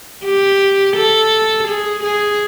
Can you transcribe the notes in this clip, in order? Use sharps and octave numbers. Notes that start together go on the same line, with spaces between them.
G4
A4
G#4
G#4